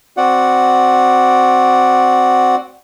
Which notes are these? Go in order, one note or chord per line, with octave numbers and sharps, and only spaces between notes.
C4 F#4 D5 F#5